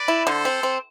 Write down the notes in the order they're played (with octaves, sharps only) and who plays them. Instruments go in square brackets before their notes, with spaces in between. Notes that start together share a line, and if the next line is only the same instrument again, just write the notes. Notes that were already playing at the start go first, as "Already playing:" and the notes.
Already playing: [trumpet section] B4 D5
[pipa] E4
[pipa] D3 [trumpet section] A4 C5
[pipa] C4
C4